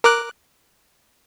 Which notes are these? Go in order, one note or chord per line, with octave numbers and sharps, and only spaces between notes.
A#4 D6 F#6